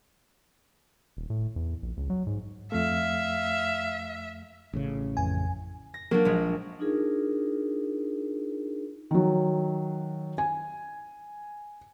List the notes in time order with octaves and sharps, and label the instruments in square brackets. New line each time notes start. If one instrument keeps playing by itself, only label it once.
[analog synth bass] D#1
A2
E2
A#1
C#2
F#3
G#2
[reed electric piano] F2 A3 [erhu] E5 [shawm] F5
[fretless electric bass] A1 A2 C#3
[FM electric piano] F2 G#5
[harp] A#6
[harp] F#3 D4 [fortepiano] A#3
[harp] A#1 G#3
[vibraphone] D4 D#4 F4 G#4 A#4
[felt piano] D#3 F#3
G#5